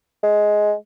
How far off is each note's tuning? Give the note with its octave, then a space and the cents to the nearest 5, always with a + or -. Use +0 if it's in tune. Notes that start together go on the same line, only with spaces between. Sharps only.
G#3 +10